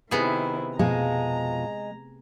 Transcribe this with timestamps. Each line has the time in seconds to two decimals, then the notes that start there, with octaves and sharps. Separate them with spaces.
0.11 C3 D#3 B3 C4 E4 G#4
0.79 F2 B2 F3 G#3 A#5